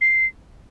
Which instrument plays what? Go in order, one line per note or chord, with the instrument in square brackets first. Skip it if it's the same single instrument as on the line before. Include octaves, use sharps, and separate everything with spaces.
[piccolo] C7